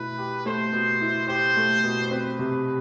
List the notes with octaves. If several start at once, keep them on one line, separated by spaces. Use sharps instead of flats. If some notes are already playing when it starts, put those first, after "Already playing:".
Already playing: B2 A3 E4 B4
G4
A3 C5
B2
E4
G4 C5
A3
B2
C4 B4
C3